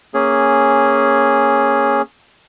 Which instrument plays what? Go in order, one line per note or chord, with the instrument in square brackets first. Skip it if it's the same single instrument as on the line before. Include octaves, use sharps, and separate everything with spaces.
[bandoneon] A#3 C#4 G#4